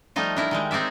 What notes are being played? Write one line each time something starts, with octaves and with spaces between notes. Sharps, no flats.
F3 G3 A3 D#4 F4
D4 E4 A#4
D#3 G3 G#3
C4 D#4 G#4 D5 E5